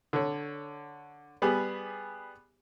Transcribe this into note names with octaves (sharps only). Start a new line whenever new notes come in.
D3 C#5
G3 B3 G4 G#4